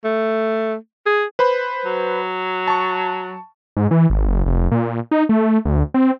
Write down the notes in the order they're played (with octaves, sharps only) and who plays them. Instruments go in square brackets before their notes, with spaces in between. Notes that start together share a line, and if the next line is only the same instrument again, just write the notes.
[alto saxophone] A3
G#4
[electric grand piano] B4 C5 B5
[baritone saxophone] F#3
[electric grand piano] A5 C#6
[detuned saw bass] G#2
E3
G#1
F#1
F1
A#2
D#4
A3
D2
C4